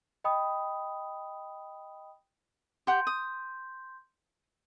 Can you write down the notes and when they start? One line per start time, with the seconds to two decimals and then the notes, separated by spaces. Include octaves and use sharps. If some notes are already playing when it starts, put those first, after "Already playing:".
0.24 D#5 G5 B5 D#6
2.87 G4 F#5 C6 G6
3.07 D#6